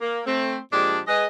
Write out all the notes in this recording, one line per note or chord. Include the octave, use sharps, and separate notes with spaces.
A#3
A3 C4
A#2 F3 G#3 D4 G4 D5
G#3 G#4 B4 D#5